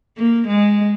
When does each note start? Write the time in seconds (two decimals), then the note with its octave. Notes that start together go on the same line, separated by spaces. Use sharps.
0.17 A#3
0.48 G#3